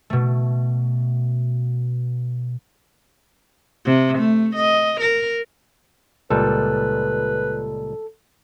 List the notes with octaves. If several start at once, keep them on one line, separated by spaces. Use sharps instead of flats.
B2 A3
C3
A3
D#5
A#4
C#2 A#2 G3 A4 B4